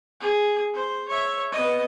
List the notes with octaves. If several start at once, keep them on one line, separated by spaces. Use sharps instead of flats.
G#4
C5
C#5 E5
B3 D#5